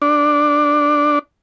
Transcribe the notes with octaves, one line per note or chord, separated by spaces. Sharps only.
D4